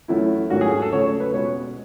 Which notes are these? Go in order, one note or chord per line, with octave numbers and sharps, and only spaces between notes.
F#2 E3 A3 E4
G#2 D#3 F#3 A3 C#4 F#4
G#4
G#4
A4
C#3 F#3 A3 C#5
C#5
B4
B2 G#3 C#4 C#5